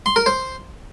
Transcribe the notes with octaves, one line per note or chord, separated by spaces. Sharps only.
C6
A#4
C5